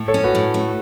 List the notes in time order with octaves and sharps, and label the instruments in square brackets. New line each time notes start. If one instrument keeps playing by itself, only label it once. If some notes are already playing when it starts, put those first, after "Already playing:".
Already playing: [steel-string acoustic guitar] A2
[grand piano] A4 C#5
[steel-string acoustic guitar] C#4
[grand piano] F#4 B4
[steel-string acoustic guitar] A2
A3